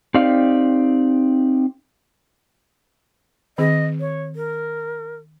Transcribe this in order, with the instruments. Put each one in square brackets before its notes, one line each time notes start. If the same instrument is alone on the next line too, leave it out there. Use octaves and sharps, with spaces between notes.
[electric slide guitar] C4 D#4 G4 D5 F5
[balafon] D#3 C4 G#4 [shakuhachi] D#5
[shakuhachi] C#5
A#4